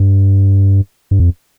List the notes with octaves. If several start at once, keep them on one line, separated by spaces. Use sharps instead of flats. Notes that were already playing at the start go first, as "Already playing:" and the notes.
Already playing: G2
G2
F2